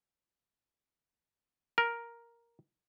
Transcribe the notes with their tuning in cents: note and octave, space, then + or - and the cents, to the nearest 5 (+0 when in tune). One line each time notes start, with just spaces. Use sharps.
A#4 +5